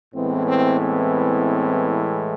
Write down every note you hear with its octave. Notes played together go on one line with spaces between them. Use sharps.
A2 E3 G#3 B3 C4
C4
C4